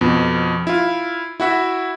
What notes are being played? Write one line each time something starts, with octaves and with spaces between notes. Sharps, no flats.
F2 B2
E4 F4
E4 F#4 E5